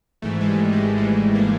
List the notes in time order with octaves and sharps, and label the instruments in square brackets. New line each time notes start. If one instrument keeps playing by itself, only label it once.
[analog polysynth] G#1 G#2 E3 A3
G#3
G3
G#3
G#1 G#2 E3 A3
A#3